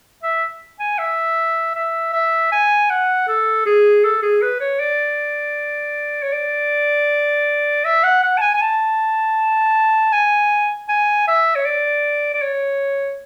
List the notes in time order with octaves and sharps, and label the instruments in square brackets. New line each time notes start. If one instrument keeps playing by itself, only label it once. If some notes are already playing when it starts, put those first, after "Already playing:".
[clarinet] E5
G#5
E5
E5
E5
G#5
F#5
A4
G#4
A4
G#4
B4
C#5
D5
C#5
D5
E5
F#5
F#5
A5
G#5
G#5
A5
G#5
G#5
E5
C#5
D5
D5
C#5